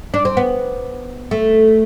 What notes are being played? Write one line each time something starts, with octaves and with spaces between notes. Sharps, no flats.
D4
C4
B3
A3